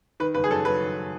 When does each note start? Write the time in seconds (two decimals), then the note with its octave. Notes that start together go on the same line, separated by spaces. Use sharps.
0.20 D#3 B4
0.35 F#1 B4
0.44 G#4
0.50 F#2 A4
0.65 F#3 B4
0.81 D#3